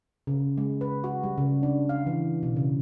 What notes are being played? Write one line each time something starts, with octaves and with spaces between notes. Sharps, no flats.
C#3
G#3
B4
F#4
G3
C#3
D4
F5
E3
B2
C#3